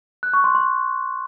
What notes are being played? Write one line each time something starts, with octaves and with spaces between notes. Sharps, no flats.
F#6
C#6
C6
C6